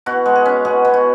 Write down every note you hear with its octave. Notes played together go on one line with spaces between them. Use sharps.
B2 F#4
G#3
G#4
C#4
B2 G#4
B2
F#4